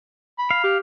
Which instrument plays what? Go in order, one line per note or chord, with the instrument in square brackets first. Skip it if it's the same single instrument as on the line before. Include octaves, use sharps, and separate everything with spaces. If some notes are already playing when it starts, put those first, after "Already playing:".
[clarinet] B5
[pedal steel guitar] F5
[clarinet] G4